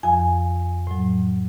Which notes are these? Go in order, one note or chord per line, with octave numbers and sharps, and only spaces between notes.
F2 F3 G#5
A2 F#3